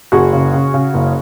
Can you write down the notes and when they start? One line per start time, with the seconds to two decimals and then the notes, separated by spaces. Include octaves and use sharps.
0.12 F#1 F#4 G#4
0.33 C#3
0.53 C#3
0.74 C#3
0.94 F#1